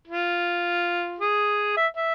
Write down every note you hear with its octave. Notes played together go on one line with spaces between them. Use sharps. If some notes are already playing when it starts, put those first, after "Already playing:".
F4
G#4
E5
E5